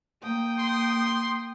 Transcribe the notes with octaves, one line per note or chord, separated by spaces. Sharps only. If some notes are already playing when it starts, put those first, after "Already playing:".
A#3 G5 D#6
C6